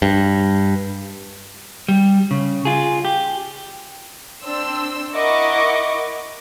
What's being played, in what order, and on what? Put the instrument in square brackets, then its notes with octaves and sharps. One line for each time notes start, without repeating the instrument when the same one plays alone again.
[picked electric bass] G2
[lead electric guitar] G3
C#3
F4 G#4
G4
[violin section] C4 D4 C6 E6
E4 A#4 D#5 F#5 C#6 D6